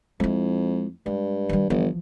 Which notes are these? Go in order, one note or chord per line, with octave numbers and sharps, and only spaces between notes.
F2 G#3 E4
G2 G#3
D#3 G3
G1 E3 F3